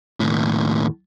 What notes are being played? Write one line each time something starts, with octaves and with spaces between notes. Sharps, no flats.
D#2 A2